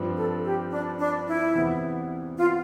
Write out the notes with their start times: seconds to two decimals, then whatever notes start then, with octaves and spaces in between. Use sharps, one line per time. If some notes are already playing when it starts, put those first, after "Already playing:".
Already playing: G2 F3 C4
0.17 A4
0.44 G4
0.72 D4
0.99 D4
1.27 E4
1.55 E2 C3 E3 B3
2.38 F4